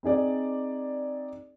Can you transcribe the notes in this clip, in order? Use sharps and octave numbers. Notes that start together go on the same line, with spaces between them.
C4 D#4 G#4 D5